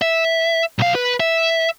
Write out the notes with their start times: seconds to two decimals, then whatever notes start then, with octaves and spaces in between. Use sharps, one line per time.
0.02 E5
0.79 B1 F5
0.95 B4
1.20 E5